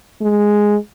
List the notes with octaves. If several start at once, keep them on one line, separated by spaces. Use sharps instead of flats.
G#3